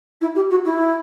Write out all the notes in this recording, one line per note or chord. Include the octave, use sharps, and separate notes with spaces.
E4
G4
F#4
E4